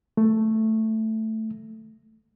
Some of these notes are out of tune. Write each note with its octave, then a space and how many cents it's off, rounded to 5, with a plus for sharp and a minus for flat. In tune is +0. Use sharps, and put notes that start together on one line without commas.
A3 +5